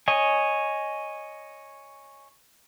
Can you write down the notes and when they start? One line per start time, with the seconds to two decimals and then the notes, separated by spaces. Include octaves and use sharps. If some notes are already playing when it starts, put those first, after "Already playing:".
0.08 C#5 D#5 G#5